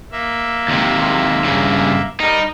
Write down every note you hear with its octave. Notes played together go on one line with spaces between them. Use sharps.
A#3 E5
D#2 C3
G2 C#3
G3 D#4 A#4